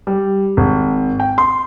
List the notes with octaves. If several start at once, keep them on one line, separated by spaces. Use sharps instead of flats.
G3
G#1
G5
C6